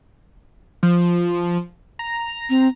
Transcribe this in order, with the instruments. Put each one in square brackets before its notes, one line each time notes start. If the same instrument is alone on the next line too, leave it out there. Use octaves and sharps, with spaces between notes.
[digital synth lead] F3
A#5
[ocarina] C4